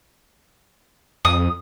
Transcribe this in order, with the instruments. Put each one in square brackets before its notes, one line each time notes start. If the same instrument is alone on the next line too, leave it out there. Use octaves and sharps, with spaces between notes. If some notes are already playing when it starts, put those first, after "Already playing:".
[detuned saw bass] F2 [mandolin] D#6